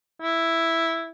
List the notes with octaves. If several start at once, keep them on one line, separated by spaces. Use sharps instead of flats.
E4